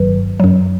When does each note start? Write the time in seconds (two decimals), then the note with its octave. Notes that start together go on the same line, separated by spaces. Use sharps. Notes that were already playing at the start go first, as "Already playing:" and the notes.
Already playing: G1 G2 D#3 F#3 B4
0.40 F#2 F#3